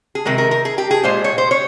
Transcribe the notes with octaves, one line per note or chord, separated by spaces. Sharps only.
G#4
C3 D#3 G#3 A#4
A#4
A#4
G#4
G4
G#4
A#2 G#3 C5
C#5
C5
C#5